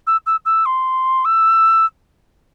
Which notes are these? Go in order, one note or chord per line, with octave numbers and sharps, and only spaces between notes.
E6
E6
E6
C6
E6